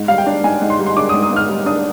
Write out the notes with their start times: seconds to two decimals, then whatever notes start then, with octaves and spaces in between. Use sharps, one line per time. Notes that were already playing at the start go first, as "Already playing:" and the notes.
Already playing: G#2
0.08 G3 F5
0.18 G5
0.27 D4
0.44 G#2 G#5
0.62 G#2
0.70 C6
0.79 G3
0.86 C6
0.97 D4 D6
1.09 D#6
1.14 G#2
1.23 D#6
1.31 G#2
1.36 F6
1.49 G3
1.66 D4 D#6